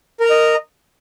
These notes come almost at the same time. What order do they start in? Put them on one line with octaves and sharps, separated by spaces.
A#4 A#5 D#5